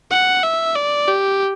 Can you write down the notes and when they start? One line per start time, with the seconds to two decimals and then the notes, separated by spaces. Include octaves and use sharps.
0.11 F#5
0.44 E5
0.76 D5
1.08 G4